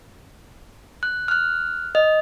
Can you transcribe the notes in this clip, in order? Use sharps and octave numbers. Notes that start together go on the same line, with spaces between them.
F#6
F6 F#6
D#5